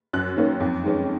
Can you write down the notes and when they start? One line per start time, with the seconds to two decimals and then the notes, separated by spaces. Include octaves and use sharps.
0.13 F#2 F#6
0.37 D#3 A#3 C#4
0.60 F2
0.84 D#3 G#3 C#4